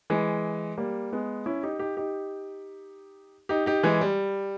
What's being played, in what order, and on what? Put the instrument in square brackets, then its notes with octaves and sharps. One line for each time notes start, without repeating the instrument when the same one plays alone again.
[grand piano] E3 G#3
G3 A#3
G#3 B3
C#4 E4
D#4 G4
D#4 G4
D#4 G4
D#4 G4
D#4 G4
E3 G#3
G3